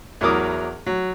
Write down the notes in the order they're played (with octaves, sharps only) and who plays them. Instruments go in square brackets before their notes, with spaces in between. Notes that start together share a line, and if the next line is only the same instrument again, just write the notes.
[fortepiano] E2 F#3 E4 A#4 D6 D#6
F#3